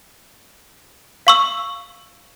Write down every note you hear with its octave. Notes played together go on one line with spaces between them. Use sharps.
F5 C#6 E6